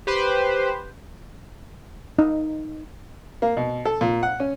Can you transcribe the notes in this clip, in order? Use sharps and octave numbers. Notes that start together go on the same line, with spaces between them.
G4 B4 C5
D#4
A#3
B2
A4
A#2
F#5
C#4